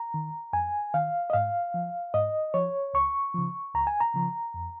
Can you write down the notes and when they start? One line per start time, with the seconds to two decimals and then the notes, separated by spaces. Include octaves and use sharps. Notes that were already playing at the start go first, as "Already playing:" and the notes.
Already playing: A#5
0.14 D#3
0.53 F2 G#5
0.94 D#3 F5
1.30 D#5
1.33 G#2 F5
1.74 F3
2.14 G#2 D#5
2.54 F3 C#5
2.94 C#2 C#6
3.34 C#3 F3
3.74 C#2 A#5
3.87 G#5
4.00 A#5
4.14 C#3 F3
4.54 F2